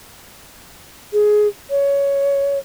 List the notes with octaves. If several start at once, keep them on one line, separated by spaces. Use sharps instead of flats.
G#4
C#5